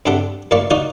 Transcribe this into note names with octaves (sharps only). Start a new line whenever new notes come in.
G2 C3 D4 G4 A4 F#5
F#2 A2 A#3 D5 F5 C#6
D#4 F4 F#4 D5 F5 F#5